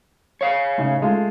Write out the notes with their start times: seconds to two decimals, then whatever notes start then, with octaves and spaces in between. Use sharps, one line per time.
0.41 C#5 F5
0.78 A2 C#3 D#4
1.02 G#3 A3 F4